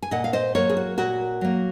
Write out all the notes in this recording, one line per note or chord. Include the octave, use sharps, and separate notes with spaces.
G#5
A#2 D#5 F#5
F5
C5 D#5
F#3 A#3 A#4 C#5
G#4
F#4
A#2 F#4 A#4
F#3 A#3